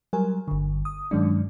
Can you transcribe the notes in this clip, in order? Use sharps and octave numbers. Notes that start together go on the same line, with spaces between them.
F#3 G3 A#4 G#5
G1 D3
D#6
G2 D#3 F#3 G#3 C#4 D4